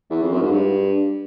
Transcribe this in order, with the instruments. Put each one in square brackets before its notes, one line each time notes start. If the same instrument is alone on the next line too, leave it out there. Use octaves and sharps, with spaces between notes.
[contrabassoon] E2
F2
F#2
G#2
G2